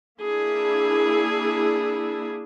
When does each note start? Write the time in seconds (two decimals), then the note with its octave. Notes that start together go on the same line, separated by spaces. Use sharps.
0.19 A#3 D4 E4 G#4